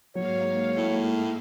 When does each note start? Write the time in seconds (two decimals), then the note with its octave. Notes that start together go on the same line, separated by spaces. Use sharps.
0.15 G#2 F#3 A#3 C#5 F5
0.76 A2